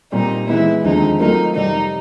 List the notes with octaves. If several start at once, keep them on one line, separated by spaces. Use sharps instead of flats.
A#2 G3 C4 D#4
E3 G#3 B3 E4
D#2 D3 F3 G#3 C4 D#4
F#3 A3 C4 D#4 F4 A#4
F2 C3 D#3 G3 D#4